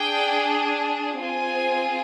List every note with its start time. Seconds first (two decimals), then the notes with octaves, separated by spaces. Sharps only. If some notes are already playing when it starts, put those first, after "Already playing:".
Already playing: D4 G#4 G5
1.21 C4 F4 G#4 G#5